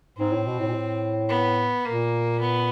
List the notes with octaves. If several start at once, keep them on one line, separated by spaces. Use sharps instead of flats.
G#2 C4
A2
B2
A2
A#2
A2
B3
A#2 A#3
B3